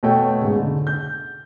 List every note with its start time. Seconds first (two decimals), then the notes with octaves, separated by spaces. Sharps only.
0.03 B2 A3 C#5 G5
0.41 G#2 C#3
0.56 D3
0.87 G6